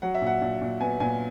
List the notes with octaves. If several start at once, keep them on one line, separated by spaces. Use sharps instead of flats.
F#3 F#5
E5
A#2 F#5
A#2
A#2
B3 G#5
A#2 G#5